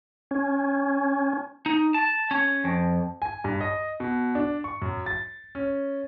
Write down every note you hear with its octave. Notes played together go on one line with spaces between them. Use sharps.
C#4
D#4
A5
C#4
F2
G#5
G2
D#5
B2
D4
C#6
F#2
A6
C#4